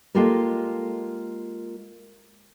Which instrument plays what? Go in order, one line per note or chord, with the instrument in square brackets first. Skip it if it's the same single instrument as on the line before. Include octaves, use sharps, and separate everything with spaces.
[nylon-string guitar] G#3 A#3 F4 G4 A4 A#4